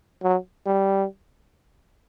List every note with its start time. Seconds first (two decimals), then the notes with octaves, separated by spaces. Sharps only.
0.23 F#3
0.66 G3